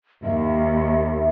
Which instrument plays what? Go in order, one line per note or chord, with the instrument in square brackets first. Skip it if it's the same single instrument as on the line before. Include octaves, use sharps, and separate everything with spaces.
[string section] D#2 [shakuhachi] E5